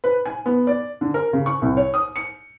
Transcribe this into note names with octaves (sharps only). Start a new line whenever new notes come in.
B4
G#5
B3
D5
D3
A#4
C#3
C#6
C2
C#5
D#6
C#7